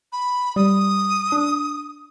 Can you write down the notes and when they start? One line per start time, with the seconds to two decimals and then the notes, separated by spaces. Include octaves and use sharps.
0.13 B5
0.56 G3 D#6
1.32 D4